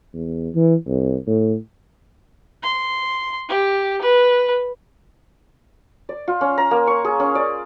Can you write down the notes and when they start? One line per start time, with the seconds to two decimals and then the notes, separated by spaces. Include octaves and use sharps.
0.13 E2
0.55 E3
0.87 C2
1.27 A2
2.62 C6
3.48 G4
4.01 B4
6.09 D5
6.28 F4
6.41 C#4
6.58 A#5
6.71 A#3
6.87 C#6
7.05 G#4
7.20 C#4
7.35 D5